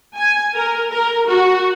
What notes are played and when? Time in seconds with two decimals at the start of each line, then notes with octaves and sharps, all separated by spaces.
0.17 G#5
0.54 A#4
0.91 A#4
1.26 F#4